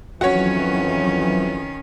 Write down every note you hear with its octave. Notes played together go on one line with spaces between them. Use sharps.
F2 D#3 E3 F#3 C#4 F#4 C#5